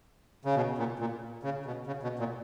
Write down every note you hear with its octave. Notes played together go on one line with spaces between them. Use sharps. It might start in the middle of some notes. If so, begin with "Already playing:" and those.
C#3
B2
A#2
A#2
C#3
B2
C#3
B2
A#2